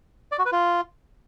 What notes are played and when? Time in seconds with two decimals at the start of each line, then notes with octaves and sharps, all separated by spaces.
0.32 D5
0.39 F#4
0.45 B4
0.52 F4